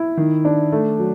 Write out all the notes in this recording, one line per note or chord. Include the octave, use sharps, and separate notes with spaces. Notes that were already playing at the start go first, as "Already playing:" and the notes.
Already playing: E4
D#3
D4
A3
F#3